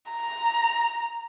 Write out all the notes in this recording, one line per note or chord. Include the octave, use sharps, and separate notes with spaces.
A#5